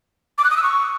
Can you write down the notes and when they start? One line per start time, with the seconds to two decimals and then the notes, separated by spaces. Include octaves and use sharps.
0.38 D6
0.44 F#6
0.51 D#6
0.57 E6
0.63 C#6